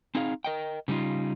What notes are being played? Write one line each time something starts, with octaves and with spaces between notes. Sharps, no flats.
C4 D#4 G#4 F5
A#4 D#5 G5
C#3 G3 A#3 D#4 F4